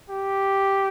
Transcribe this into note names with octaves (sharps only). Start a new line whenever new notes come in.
G4